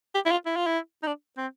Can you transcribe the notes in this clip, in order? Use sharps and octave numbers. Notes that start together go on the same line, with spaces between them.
G4
E4
F4
E4
F4
E4
D#4
D4
C4